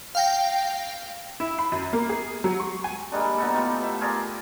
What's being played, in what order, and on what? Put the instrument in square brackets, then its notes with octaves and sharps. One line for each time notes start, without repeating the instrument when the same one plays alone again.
[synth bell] F5 G5 A#6
[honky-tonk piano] E4
B5
F#2
A#3
G#4
F#3
C#6
G#5
[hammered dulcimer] G3 G#3 A#3 D4
B2 B3 D#4 A4
A2 F4 G4
E5
F4 G#4 A#4 D5